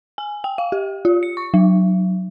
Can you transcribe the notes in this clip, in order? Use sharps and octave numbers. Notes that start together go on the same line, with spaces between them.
G#5
G5
F5
G4
F4
C#7
C#6
F#3